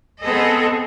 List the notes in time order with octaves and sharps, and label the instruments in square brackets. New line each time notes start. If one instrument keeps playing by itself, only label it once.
[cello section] B3 C4 G#4 A4 D#5